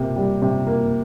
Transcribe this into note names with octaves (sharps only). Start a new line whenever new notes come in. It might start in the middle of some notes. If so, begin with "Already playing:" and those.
Already playing: C3 A#3
G3
C3
A#3